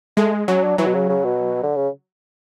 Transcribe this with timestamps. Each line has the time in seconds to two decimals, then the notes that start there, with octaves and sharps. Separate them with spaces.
0.17 G#3 A3
0.48 F#3 C#4
0.63 D4
0.78 E3 F#3
0.86 B2
0.94 C#3
1.09 C#3
1.25 B2
1.64 D3
1.76 C#3